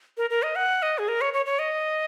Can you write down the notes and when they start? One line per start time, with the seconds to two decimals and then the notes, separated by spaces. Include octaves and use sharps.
0.17 A#4
0.30 A#4
0.43 D#5
0.56 F#5
0.82 D#5
0.98 G#4
1.08 A#4
1.21 C#5
1.34 C#5
1.46 C#5
1.59 D#5